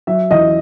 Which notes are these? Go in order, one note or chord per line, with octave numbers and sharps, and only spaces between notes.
F#3 E5
E2 D#5